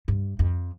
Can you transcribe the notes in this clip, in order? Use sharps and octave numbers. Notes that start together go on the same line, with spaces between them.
G2
F2